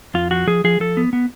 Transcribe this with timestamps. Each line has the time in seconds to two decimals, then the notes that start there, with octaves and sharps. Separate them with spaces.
0.14 F2 F4
0.31 F3 F#4
0.47 F3 G#4
0.64 F3 G#4
0.80 F3 A4
0.97 B3
1.13 B3